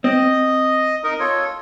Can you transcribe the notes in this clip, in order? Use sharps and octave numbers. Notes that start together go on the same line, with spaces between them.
C4 D#5
D#4 A#4 D#5
F4 A4 C#5